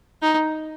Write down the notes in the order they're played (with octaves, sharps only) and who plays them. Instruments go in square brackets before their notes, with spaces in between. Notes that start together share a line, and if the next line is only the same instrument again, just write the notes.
[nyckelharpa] D#4